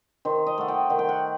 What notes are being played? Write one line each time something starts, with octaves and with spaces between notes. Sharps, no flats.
D#3 C5
D#5
A3 F#5
G5
D#3 F#5
G5
F#5